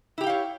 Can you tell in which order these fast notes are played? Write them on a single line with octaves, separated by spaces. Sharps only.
E4 G4 G5 F5 C#5